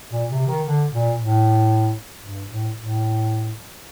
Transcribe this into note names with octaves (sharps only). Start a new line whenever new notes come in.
A#2
C3
D#3
D3
A#2
A2
G2
A2
A2